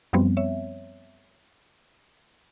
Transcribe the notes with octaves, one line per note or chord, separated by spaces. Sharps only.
F#2 F3 G3 B3 C4
C#5 E5